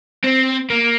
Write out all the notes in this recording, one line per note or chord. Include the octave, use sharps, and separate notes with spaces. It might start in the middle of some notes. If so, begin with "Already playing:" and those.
C4
A#3